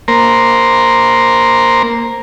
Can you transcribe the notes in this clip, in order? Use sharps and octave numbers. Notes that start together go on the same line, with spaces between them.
A#3 A#4 C5